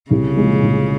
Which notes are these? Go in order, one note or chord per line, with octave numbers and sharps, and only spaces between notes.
C2 C#3
A#2 F3 G#3
C2